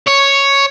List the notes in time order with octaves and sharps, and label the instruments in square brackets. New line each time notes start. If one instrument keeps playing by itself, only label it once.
[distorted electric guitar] C#5